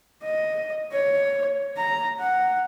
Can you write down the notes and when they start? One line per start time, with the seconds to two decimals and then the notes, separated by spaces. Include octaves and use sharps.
0.23 D#5
0.93 C#5
1.77 A#5
2.20 F#5